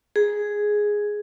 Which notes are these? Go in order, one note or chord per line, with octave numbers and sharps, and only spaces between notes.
G#4